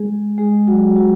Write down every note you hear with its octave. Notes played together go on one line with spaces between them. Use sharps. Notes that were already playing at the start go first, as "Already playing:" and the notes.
Already playing: G#3 G#4
G#3 G#4
F#3 F#4
F#3 F#4